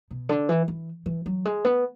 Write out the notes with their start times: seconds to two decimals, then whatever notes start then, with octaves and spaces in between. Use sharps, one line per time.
0.11 B2
0.29 D3
0.49 E3
0.68 E3
1.06 E3
1.26 F#3
1.45 G#3
1.65 B3